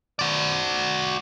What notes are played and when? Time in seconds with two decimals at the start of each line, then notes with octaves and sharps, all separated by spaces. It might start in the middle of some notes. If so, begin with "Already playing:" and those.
0.19 F#4 D5